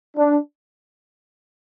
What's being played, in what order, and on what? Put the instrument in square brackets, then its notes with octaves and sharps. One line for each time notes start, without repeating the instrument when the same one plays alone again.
[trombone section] D4